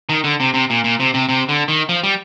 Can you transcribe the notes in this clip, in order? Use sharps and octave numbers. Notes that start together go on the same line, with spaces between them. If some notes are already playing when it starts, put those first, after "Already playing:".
D#3
D3
C3
C3
A#2
A#2
C3
C3
C3
D3
D#3
F3
G3